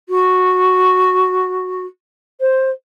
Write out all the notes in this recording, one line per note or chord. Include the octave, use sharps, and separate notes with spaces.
F#4
C5